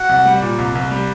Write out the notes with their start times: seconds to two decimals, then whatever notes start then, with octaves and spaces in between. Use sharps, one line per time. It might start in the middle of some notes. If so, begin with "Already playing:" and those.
Already playing: F#4 F#5
0.09 C2
0.26 G3
0.42 A#2
0.58 C2
0.75 C2
0.91 G3